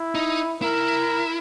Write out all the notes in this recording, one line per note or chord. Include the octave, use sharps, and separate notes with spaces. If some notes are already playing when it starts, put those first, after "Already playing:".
Already playing: E4
D#4
E4 A#4